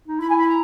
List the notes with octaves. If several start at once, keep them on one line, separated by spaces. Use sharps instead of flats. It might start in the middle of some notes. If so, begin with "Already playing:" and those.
D#4
E4 B5
G#5
B5
A#5